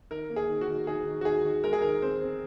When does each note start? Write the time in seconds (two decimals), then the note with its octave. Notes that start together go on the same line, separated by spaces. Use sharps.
0.11 D#3 A#4
0.30 A#3
0.36 G#4
0.49 D#3
0.61 F#4
0.68 D#3
0.87 D#3 G#4
1.06 D#3
1.21 F#4
1.25 D#3 G#4
1.44 D#3
1.64 G#3 A#4
1.73 G#4
1.81 D#3 A#4
2.02 C4 C5
2.20 C4